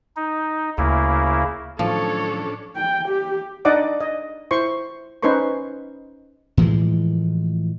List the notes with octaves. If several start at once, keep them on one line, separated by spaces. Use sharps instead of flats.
D#4
D2 C#3 A#3 E4
A2 D#3 F3 F#3 C#4 D4 A4 C#5
G5
G4
D4 D#4 D5 D#5 F#5 D6
D#5
E4 C5 C6 C#6
C#4 D#4 B4 C5 C6 C#6
A2 E3 F3 G#3